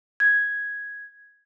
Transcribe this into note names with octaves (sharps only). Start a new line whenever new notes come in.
G#6